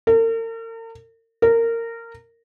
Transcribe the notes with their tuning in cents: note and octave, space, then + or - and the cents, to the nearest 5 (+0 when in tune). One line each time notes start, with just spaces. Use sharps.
A#4 -45
A#4 -20